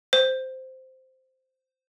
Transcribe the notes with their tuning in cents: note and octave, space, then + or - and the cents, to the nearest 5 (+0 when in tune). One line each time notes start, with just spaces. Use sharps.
C5 -5